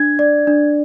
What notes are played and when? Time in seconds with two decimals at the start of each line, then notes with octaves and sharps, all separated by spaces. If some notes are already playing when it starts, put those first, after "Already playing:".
Already playing: D4 G#6
0.19 D5
0.47 D4